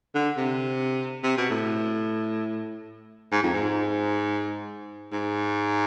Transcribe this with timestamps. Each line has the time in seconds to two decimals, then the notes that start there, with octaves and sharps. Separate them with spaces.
0.15 D3
0.37 C3
1.24 C3
1.37 B2
1.50 A2
3.32 G#2
3.43 F2
3.53 G#2
5.12 G#2